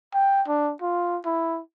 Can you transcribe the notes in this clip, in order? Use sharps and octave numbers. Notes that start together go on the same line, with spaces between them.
G5
D4
F4
E4